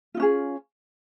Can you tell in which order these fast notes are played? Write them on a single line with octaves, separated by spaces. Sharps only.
F4 D#4 C#4 G#4